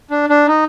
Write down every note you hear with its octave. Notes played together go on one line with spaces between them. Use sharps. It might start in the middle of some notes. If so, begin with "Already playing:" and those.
D4
D4
D#4